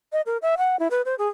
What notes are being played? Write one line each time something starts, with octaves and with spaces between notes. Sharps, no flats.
D#5
A#4
E5
F#5
E4
B4
C5
G#4